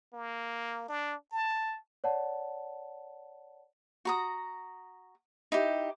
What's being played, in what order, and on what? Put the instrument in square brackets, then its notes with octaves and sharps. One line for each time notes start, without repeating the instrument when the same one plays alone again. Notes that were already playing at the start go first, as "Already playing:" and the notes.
[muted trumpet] A#3
D4
A5
[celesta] C#5 D5 F#5 A5
[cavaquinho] F#4 A#5 D#6
D#4 E4 G4